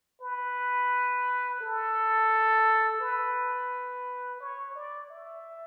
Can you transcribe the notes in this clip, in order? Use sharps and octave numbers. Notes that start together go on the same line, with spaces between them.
B4
A4
B4
C#5
D5
E5